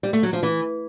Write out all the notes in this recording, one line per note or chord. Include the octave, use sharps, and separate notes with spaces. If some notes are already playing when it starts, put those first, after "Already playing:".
G3
A3
F#3
F3
E3